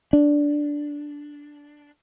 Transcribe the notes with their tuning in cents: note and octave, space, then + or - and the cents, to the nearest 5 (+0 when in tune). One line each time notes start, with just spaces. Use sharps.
D4 -5